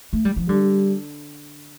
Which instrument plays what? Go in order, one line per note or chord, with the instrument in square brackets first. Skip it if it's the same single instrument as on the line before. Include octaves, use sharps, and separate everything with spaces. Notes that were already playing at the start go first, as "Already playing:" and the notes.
[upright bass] A3
G3
F3
[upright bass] D3 [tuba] G3